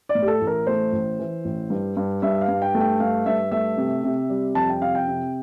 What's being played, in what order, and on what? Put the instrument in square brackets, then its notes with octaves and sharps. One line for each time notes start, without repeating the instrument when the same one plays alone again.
[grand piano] D5
A2
G4
A4
A1
A#4
A3 C5
A1
E3
A1
G2
G2
G2 E5
F5
G2
G5
A3
G5
G2 F5
G2 E5
A3 E5
C3
C3
G3
F2 A5
G5
C3 F5
G5
C3